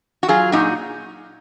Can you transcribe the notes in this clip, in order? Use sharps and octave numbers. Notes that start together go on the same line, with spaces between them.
F#4
F#3 F4 G#4
A#2 D#4 F#4